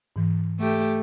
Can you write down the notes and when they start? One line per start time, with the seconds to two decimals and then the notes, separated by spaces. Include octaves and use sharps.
0.16 G#2 E3
0.60 A3 G4